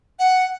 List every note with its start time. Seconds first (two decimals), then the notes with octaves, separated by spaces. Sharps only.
0.19 F#5